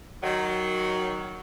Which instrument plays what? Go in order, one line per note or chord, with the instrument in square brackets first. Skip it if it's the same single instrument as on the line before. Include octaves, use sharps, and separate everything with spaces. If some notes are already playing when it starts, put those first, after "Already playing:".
[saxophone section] D#3 F#3